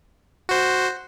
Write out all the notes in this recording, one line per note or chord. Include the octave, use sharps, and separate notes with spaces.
F#4 C5